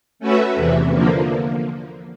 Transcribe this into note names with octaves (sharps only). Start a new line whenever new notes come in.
A3 C#4 F#4 B4 E5
E2 C3 E3
D3 F3 A#3